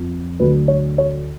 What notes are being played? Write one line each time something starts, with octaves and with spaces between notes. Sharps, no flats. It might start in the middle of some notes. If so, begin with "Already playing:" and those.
Already playing: F2 F3
D2 D3 F#3 B4
C#5
C#5